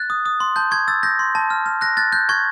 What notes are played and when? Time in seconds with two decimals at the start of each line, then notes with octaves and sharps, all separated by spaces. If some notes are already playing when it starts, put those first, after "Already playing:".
Already playing: F#6 A6
0.10 D#6
0.26 D#6
0.40 C6
0.56 A5 G6
0.71 C#6 G#6
0.88 E6 A6
1.03 G6 A#6
1.19 C6
1.35 A5
1.50 F6
1.66 F6
1.81 F#6 A#6
1.97 F#6 A6
2.12 F#6 G6
2.29 C#6 G#6